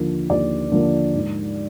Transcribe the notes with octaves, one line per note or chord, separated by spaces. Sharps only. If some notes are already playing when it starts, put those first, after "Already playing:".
Already playing: D#2 D3 F3 A#3
D#2 D5
D3 F3 A#3
G#2